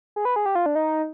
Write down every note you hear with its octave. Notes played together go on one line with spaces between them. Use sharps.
G#4
B4
G#4
G4
F4
D4
D#4